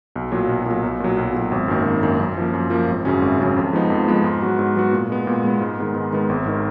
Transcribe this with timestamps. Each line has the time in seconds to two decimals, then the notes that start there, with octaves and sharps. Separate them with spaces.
0.16 B1
0.32 A#2 F#3
0.49 B1
0.66 A#2 F#3
0.83 B1
1.00 A#2 F#3
1.17 B1
1.35 A#2 F#3
1.51 G#1
1.68 F#2 D#3 A#3
1.86 G#1
2.03 F#2 D#3 A#3
2.20 F#2
2.37 F3 A#3
2.54 F#2
2.70 F3 A#3
2.88 G#1
3.05 F#2 C#3 F#3 C#4
3.22 G#1
3.39 F#2 C#3 F#3 C#4
3.56 F2
3.73 F3 G#3 B3 D#4
3.90 F2
4.07 F3 G#3 B3 D#4
4.24 G#2
4.42 F#3 B3 F#4
4.59 G#2
4.76 F#3 B3 F#4
4.93 A#2
5.10 G#3 B3
5.27 A#2
5.44 G#3 B3
5.61 G#2
5.78 D#3 G#3 B3
5.95 G#2
6.13 D#3 G#3 B3
6.29 G#1
6.46 G#2 D#3